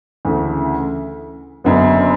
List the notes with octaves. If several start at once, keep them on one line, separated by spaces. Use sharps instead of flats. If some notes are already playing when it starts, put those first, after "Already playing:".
D2 C#3 E3 A3
F#1 F#2 D3 F#3 B3